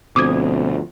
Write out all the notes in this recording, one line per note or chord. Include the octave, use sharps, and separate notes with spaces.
D2 B2 F3 C4 D6 D#6 G#6